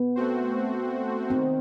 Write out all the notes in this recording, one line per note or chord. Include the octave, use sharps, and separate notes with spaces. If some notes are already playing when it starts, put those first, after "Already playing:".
Already playing: B3
A3 C4 F#4 C5
D#3 C4